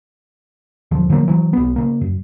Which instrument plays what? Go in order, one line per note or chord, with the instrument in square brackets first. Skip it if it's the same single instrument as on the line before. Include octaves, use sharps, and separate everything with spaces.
[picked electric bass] D#1 D2 G2 F3
D3 F3 F#3 A#3
E3 F#3
B1 B3
C#3 A#3
F#2